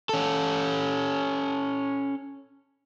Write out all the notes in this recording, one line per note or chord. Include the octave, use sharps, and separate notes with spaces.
C#4 A4